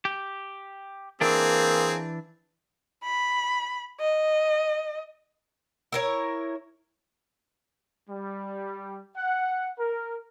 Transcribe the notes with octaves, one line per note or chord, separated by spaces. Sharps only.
G4
E3 A#3 C4 D4 G#4
B5
D#5
E4 A#4 C#5
G3
F#5
A#4